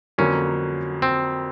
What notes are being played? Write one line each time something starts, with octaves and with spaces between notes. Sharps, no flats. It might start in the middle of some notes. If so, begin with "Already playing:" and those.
F2 D3 F#3 A#3 C#4
C4